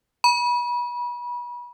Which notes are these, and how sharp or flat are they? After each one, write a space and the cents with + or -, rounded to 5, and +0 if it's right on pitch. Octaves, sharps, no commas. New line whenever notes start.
B5 -30